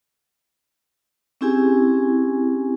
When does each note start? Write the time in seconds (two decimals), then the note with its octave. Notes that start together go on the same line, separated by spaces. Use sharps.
1.41 C4 C#4 E4 G4 G#4 G#5